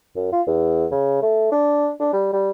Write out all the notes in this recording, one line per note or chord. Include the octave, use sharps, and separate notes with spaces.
F#2
F4
E2
C#3
A3
D4
D4
G3
G3